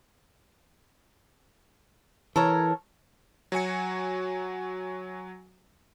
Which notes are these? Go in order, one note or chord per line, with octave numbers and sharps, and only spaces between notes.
E3 A4 A#4 C#5
F#3 F#4 G#5 C#7